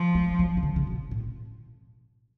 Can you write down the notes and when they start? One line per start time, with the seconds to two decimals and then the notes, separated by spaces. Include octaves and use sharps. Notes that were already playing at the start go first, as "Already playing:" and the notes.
Already playing: F3
0.15 G#3
0.39 F#3
0.57 C#3
0.63 D3
0.76 C#3
0.87 B2
1.11 A2